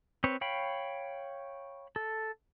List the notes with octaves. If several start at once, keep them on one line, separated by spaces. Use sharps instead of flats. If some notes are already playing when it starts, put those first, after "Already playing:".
C4 B4 C#5
C#5 F5 G5 B5
A4